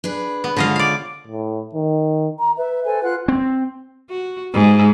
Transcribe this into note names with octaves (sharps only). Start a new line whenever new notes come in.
D4 G#4 B4
B3
D3 G#3 F4 C#5 D#5 F5
D5 F5
A2
D#3
A#5
B4 E5
A4 C5 G#5
F4 F#5 F#6
C4
F#4
G#2